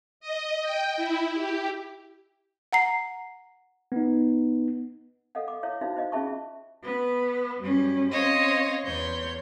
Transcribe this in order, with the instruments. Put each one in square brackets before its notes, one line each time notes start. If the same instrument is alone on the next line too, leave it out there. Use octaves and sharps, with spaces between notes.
[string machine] D#5
G5
E4
G4
[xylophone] F#5 A#5 C7
[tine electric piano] B3 D#4
[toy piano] A4 D#5 F5 F#5
D6
E4 C#5 E5 F5
D#4 E4 F#4 C5 E5 F5
C5 D#5 F5
C#4 F4 G#4 E5 A5 C#6
[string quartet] B3
F#2 G3 C#4
C4 C#4 C5 C#5 D#5 F5
E2 C#5 C6 G6